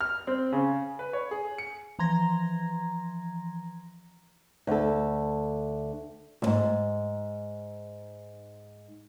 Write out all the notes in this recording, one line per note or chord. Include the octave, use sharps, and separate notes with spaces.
F6
C4
C#3
B4
C#5
G#4
C#7
E3 F3 A#5 C6 G#6 A#6
D2 A4
D2 G#2